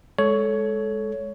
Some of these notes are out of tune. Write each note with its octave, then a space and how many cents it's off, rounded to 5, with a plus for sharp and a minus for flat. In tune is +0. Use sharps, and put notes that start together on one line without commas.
G#3 +0 A4 -15 C#5 +10